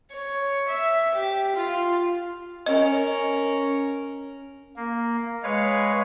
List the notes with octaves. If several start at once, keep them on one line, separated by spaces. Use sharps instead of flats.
C#5
E5
G4
F4
C#4 A#4 D#5
A#3
G#3 B4 C#5 F5